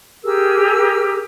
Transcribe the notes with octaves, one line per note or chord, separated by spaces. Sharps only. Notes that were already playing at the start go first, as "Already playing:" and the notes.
G4 G#4 A#4 E6